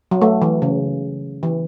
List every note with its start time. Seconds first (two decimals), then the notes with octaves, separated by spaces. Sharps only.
0.11 F#3
0.22 A3
0.42 E3
0.62 C#3
1.43 E3